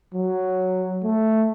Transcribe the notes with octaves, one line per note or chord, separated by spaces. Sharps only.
F#3
A3